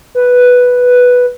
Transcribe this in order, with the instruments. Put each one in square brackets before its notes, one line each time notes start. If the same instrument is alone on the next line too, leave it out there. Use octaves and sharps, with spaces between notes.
[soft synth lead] B4